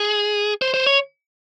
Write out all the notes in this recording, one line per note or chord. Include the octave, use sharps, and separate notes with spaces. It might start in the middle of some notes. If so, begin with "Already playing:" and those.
Already playing: G#4
C5
C5
C#5